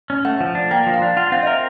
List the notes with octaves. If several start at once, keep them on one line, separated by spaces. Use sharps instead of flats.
C#4
A3 F#5
F3
D4
A#3 G5
F3
F5
D4
F4 F#5
C4 F5
D#5
A#4 E5